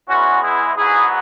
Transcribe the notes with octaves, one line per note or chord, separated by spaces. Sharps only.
E2 E3 G#3 B3 C#4 F#4
E4 G#4
G#2 F#3 B3 E4 G#4